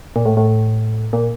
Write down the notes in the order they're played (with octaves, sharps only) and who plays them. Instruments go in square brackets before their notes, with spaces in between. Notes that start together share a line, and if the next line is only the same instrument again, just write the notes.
[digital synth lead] A#2
A2
A2
A#2